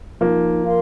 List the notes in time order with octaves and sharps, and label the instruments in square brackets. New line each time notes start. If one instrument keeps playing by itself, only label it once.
[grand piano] F3 A#3 [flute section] D#4
[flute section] A#4 F5 C6